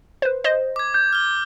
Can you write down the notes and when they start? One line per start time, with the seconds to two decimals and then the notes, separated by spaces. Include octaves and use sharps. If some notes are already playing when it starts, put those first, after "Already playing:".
0.22 B4 C5
0.44 C5 D#5
0.76 D6 G#6
0.94 G6
1.13 F6 G7